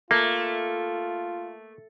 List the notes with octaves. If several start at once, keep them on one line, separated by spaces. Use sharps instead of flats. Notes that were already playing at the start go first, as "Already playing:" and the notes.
A3 A#3 F4